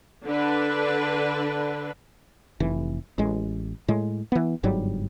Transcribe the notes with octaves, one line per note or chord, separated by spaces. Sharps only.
D3 D4 B4
F1 E3
A1 G#3
A2 G#3
E3 B3
G1 G#2 F#3 G3